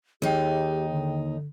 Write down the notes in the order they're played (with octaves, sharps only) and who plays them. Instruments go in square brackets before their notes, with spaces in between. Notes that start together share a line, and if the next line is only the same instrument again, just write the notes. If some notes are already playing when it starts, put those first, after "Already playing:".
[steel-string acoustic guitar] D#2 D#4 [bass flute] G4 [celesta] G#4 G5
[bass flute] D3